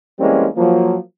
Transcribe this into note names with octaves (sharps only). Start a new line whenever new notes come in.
E3 G3 G#3 A#3 C4 C#4
F3 F#3 A#3